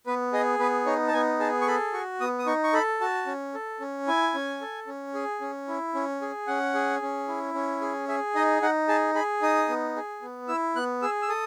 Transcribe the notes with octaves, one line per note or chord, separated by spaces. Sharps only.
B3 B4
G#4 D#5
B3 B4
D#4 C#5
A5
B3 G#5
G#4 A5
C#6
A4 B5
F#4 C#6
B3 D#6
D#6
D#4 C#6
C#6
A4 B5
F#4 A5
C#4
A4
C#4
E4 G#5
C#4
A4
C#4
G#4
C#4
E4
C#4
G#4
C#4 F#5
G#4
C#4
E4
C#4
G#4
G#4 E5
D#4 D#5
D#4 F#5
G#4 A5
G#4 B5
D#4 D#6
B3
G#4
B3
E4 E6
B3 F#6
G#4 E6
E6
A4 D#6